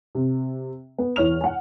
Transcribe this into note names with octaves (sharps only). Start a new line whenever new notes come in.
C3
B3
E2 E3 C#5 F6 F7
F#5 G#5